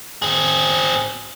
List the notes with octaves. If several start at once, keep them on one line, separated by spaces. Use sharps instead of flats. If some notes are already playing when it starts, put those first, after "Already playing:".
C4 G#4